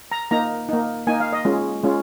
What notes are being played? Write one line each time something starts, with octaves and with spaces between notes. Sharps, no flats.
A#5
A#3 D#4 A#5
A#3 D#4
A#3 D#4 G#5
F5
D#5
G#3 C#4 F4
G#3 C#4 F4